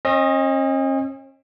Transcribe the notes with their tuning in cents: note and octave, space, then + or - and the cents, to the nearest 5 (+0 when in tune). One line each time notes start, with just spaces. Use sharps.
C#4 -45 D#5 +0